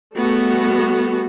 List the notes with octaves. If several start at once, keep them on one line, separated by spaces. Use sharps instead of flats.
G3 A3 B3 F#4 G#4